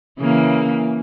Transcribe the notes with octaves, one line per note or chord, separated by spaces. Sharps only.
C#3 E3 A#3